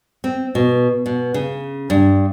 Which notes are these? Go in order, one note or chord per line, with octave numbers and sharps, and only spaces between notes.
C4
B2
B2
C#3
G2